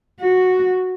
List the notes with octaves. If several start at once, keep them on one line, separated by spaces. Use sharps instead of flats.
F#4